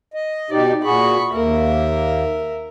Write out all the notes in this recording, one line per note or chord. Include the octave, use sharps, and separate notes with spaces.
D#5
B2 D#4 G4 D5
A#2 F#4 G#4 B5 C#6
D#2 A#3 A#4 E5